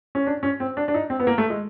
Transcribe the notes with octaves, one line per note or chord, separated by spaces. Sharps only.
C#4
D4
C#4
C4
D4
D4
D#4
C4
B3
A#3
A3
G#3